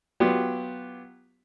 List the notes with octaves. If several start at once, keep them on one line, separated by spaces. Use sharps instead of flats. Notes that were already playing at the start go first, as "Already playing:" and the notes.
F#3 B3 F4 G4